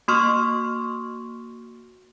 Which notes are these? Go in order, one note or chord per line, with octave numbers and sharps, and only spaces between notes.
A#3 F#4 C6 C#6 F6